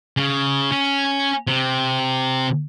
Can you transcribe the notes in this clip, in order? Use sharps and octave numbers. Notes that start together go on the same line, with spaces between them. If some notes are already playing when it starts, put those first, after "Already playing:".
C#3
C#4
C3